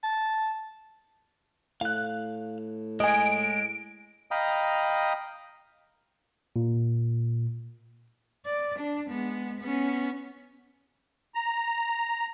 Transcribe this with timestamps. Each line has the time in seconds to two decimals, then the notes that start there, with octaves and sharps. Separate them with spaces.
0.03 A5
1.81 A2 F5 F#6
3.00 G#3 D#5 G#5 D7
4.31 D#5 F5 G5 A#5 B5 D#6
6.56 A#2
8.46 D5
8.79 D4
9.09 G#3 B3
9.59 B3 C#4
11.35 A#5